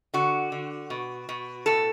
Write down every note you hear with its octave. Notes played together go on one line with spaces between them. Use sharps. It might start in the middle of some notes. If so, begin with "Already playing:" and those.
D3 F#4
D3
B2
B2
A2 A4